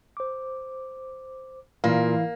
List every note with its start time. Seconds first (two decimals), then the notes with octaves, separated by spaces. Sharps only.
0.17 C5 D6
1.84 A#2 E3 A#3 E4 F5